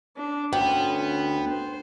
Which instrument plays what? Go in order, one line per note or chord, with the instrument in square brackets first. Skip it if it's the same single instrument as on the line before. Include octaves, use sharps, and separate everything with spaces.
[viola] D4
[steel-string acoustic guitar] D2 [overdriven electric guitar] B3 [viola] C#4 C5 [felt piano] G5
[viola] C5